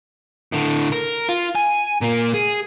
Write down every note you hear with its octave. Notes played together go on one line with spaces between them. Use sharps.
A2 D3
A#4
F4
G#5
A#2 A#3
G#4